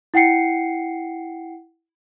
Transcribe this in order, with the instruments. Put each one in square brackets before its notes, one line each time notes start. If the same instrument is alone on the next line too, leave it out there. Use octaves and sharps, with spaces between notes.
[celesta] E4 F#5 G5 C7 C#7